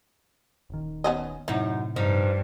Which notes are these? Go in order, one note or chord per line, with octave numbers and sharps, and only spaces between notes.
D#1 D#3
B3 C#4 D#5
F#2 A2 C3 D#4 E4
G2 F3 D#4